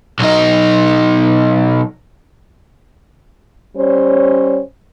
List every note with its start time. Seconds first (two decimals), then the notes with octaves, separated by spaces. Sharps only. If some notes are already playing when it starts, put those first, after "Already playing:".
0.19 B1 D#4
3.76 G3 C#4 C5 C#5